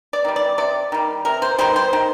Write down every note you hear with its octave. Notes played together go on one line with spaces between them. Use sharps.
D5
D#3 G3
D5
C3 D5
D#3 G3
C3 A#4
C5
D#3 G3 C5
C5
D#3